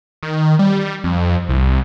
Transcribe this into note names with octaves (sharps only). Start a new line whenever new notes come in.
D#3
G3
F2
C2